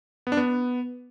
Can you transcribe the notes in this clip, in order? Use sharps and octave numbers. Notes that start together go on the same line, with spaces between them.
B3
D4
B3